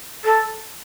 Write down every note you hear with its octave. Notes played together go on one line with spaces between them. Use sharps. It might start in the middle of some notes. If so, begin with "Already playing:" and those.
A4